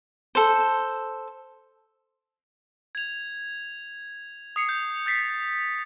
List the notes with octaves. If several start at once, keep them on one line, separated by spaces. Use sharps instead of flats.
A4 C5
G#6 F7
D#6 C7 C#7
G6
G6 A6 B6 C7